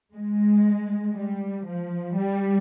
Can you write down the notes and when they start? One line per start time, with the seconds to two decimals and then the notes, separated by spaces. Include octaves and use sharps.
0.14 G#3
1.15 G3
1.66 F3
2.17 G3